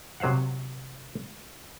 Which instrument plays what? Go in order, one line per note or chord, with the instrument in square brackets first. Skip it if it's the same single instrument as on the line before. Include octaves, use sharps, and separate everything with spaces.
[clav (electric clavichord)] C3 F#3 C5 F5 F#5